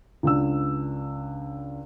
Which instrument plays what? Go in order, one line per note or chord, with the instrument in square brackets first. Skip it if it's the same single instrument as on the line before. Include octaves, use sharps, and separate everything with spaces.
[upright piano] C#2 D4 E6